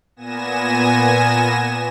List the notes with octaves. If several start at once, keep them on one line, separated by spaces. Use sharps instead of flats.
A#2 B3 G#5 A#6 E7